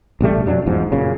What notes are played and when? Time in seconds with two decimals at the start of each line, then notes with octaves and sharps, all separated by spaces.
0.21 A1 B2 G3 A3
0.46 F2 F#3 D4
0.66 G1 E2 G#2 F3
0.92 F#2 A#2 C#3